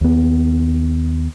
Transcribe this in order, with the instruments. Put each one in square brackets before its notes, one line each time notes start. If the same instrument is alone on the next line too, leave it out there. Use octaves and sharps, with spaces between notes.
[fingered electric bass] D#2 B3